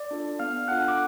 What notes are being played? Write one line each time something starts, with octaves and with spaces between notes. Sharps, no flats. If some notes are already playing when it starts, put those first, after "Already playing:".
Already playing: D5 D6
D4 F4 A4
B3 F5 F6
D4 F4 A4 F#5 F#6
D6